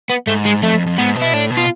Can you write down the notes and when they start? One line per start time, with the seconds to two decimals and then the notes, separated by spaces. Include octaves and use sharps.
0.10 B3
0.27 G#2 A3
0.45 G#3
0.62 F2 A3
0.74 F2
0.87 F2
0.98 G#2 B3
1.15 B2
1.21 E4
1.32 A2 D4
1.50 B2
1.57 F4